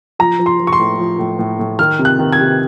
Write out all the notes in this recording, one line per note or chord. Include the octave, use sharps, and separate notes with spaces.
F3 A#5
F3
C6
F3
C#6
C6
A2
F3
A2
A2
A2
D#3 F6
C3
F#6
D#3
G#6
C3